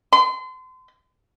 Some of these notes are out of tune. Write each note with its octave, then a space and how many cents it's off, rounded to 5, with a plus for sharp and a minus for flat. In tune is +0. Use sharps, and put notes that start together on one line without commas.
C6 -35